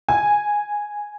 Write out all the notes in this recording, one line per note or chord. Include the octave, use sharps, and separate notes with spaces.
G#5